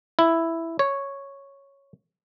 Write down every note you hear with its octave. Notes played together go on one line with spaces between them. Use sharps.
E4
C#5